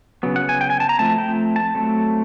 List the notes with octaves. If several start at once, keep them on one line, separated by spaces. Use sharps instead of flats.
C#3 F#3 B3
F#5
G#5
G5
G#5
A5
A#5
F3 A3 C4 A5
G5
A5
F#3 A3 C4